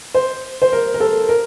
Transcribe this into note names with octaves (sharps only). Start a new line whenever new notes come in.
C5
C5
A#4
A#4
A4
A#4